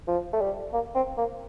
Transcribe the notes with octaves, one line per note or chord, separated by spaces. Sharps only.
F3
A3
G3
A#3
C4
A#3